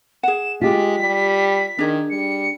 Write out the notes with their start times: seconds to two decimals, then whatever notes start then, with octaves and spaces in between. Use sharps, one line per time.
0.23 G#4 F#5 E7
0.61 G#3 F4 G4 B6
0.99 G3
1.79 D#3 D4 G#4
2.10 G3 C#7